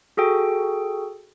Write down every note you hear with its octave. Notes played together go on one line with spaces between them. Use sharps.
F#4 G#4 A4 G5